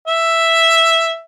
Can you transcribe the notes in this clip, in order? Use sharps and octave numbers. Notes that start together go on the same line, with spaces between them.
E5